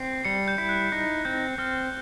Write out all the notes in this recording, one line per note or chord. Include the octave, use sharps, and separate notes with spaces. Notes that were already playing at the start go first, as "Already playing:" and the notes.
Already playing: C4 C7
G3 C#7
G6
E4
F#6
D#4 G6
C4 G6
C4 F6